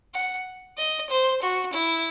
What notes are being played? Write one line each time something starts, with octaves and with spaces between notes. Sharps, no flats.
F#5
D#5
C5
F#4
E4